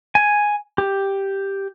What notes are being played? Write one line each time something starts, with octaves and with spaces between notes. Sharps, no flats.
G#5
G4